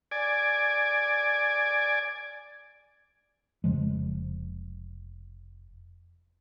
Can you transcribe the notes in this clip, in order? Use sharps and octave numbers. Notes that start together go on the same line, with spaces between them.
D5 G#5
F1 C#3 F3 G#3